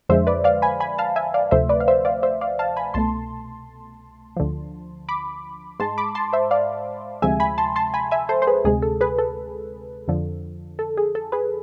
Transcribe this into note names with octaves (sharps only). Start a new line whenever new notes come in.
F2 D3 F3 G#3 C5 E5
B4 D5
D5 F5
G#5 B5
G#5 B5
F5 A5
E5 G#5
D5 F5
D2 C3 F3 A3 C5 E5
B4 D5
F5
C5 E5
D5 F5
C5 E5
D5 F5
F5 A5
G#5 B5
C2 B2 A3 A5 C6
D2 D3 F3
B5 D6
G#2 G#3 A5 C6
B5 D6
A5 C6
C5 E5
D5 F5
D2 C3 F3 G#3 E5 G#5
G#5 B5
A5 C6
A5 C6
G#5 B5
E5 G#5
A4 C5
C5
G#4 B4
D2 C3 G#3 G#4
A4
G#4 B4
A4
F2 D3 F3
A4
G#4
A4
G#4 B4